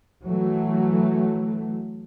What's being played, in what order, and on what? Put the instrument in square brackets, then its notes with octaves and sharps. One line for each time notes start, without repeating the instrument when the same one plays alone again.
[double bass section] E3 F#3 A3